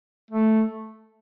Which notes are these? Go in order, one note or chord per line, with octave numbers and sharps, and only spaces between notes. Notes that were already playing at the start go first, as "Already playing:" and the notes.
A3